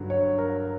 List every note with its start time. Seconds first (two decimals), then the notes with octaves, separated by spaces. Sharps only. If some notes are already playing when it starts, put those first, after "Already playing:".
Already playing: G2 D3 F#3
0.10 C#5
0.38 A#4